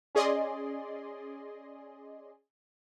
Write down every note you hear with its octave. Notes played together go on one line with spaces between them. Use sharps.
C#4 G#4 D5 D#5 C6